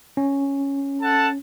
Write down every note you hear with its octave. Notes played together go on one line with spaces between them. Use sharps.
C#4
A4 F#5 A5